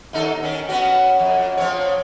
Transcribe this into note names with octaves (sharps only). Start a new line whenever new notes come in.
D#2 D#4 A4
D#3 C#4
B3 C#4 F#4
F2
F3 C4 C#5